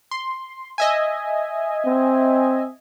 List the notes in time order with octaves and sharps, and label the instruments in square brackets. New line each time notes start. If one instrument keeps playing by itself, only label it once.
[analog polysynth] C6
D#5 E5 G#5
[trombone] C4